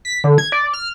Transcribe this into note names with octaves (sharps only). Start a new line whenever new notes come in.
B6
D3
G#6
D5
F6